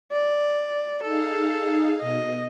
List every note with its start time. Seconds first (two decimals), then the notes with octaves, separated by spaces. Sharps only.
0.12 D5
1.03 D#4 G#4 A4 F5
2.01 B2 D#5